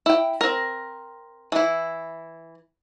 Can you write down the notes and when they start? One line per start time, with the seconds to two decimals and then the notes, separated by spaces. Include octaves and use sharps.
0.06 E4 G5
0.41 C4 A#4
1.52 E3 E4